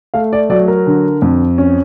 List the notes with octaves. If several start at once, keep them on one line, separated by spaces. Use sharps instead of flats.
A3 F5
D5
F#3 D5
A#4
D3
F2
C#4